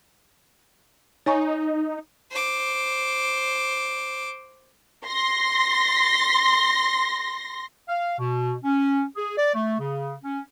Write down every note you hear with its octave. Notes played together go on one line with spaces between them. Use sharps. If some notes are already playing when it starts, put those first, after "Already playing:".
D#4 C#5 G#5 C#6
C5 D6
C6 A#6
F5
B2
C#4
G#4
D5
A3
C#3
C#4